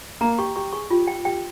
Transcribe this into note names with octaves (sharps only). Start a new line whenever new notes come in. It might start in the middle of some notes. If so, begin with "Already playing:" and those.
A#3 A#5
G4 C#6
G4 C#6
G#4 C#6
F4 G4
G5
G4 G5